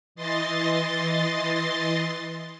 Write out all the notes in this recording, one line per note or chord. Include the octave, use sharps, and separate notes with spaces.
E3 D#5 C6 A6